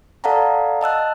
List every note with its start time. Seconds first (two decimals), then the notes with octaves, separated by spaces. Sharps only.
0.24 A4 D5 F5 F#5 A5 A#5
0.81 D#5 A5 E6 F#6